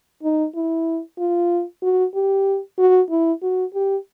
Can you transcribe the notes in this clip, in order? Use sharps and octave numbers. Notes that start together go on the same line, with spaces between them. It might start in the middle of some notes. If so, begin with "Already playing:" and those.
D#4
E4
F4
F#4
G4
F#4
E4
F#4
G4